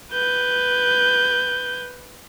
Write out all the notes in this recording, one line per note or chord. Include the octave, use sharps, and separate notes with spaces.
B4 G6